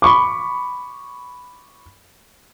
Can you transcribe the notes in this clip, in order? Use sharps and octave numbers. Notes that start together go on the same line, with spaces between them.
B5 C#6 D6